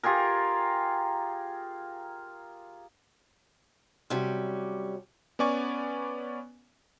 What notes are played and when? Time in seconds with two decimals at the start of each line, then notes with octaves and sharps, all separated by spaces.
0.03 F4 G4 G#4 A#4
4.10 C3 F#3 G3 C#4
5.39 B3 C#4 D5 G#5 C#6